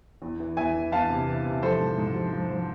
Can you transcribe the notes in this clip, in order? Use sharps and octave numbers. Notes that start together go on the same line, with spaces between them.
E2
E3
E2 E5 G#5
E3
E2 F5 A5
C3
E3
C3
F3 A4 C5
G#2
G#2
F3
F3
F3